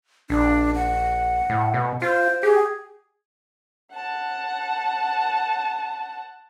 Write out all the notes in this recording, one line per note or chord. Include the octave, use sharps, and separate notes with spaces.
A#1 D4
F#5
A2
B2
F4 C5
G4 G#4
F#5 A5